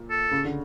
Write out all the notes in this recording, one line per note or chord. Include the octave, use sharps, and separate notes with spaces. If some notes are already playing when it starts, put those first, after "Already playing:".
Already playing: A#2
A4
C#3
D3